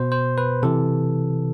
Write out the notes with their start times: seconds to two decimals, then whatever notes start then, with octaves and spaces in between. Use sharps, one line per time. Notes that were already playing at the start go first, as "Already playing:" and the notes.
Already playing: B2 C5
0.12 C5
0.38 B4
0.63 C3 E3 A4